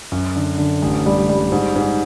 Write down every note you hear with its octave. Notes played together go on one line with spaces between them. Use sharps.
F#2
D3
D3
A1
G3
G3
G#2
G#2